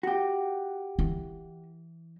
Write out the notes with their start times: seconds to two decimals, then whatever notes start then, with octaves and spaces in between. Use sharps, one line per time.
0.03 F#4 G4
0.99 E3